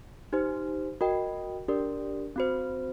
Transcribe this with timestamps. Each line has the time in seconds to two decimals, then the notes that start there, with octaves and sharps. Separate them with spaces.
0.33 D#4 G4 C5
1.01 F#4 A#4 D#5 G5
1.68 D4 G4 A#4 D5
2.36 C4 F#4 C5